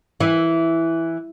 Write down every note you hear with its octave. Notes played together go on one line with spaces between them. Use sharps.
E3